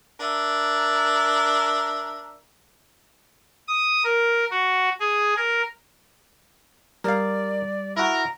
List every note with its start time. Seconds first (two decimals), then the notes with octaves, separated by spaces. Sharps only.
0.19 D4 A#4 E5
3.68 D#6
4.04 A#4
4.51 F#4
5.00 G#4
5.37 A#4
7.04 G3 A#4 D5 F5
7.96 E4 F#4 A#4 A#5